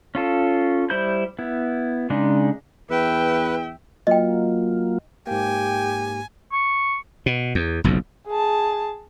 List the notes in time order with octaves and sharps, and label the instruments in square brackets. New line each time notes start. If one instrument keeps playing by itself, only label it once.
[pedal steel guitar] C#4 F4 A4
G3 E4 C5 B5 G6
B3 E4
C#3 G#3 D4 D#4
[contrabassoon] E2 [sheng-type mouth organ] B4 [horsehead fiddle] E5 G5
[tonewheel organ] F#3 A#3 F4 [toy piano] D#5 G5
[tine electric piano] G#2 A#3 [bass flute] G4 [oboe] G5 [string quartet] G#5
[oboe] C#6
[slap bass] B2
E2
F#1 B1 F2
[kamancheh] G#4 A5